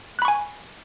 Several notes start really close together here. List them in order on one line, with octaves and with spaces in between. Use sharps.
F#6 B5 C#6 G#5